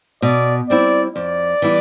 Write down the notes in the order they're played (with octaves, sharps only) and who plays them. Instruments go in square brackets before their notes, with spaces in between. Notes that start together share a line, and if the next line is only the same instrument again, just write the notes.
[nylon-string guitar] B2 [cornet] D5
[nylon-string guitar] G3 C4 E4 [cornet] D5
[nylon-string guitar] F2 [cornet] D5
[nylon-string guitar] E3 G3 B3 E4